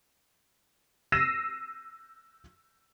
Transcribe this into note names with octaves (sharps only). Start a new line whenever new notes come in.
E6 A#6 C7 D#7 E7